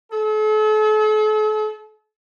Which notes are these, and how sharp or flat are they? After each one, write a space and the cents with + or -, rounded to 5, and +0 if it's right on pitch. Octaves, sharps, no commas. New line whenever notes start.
A4 -40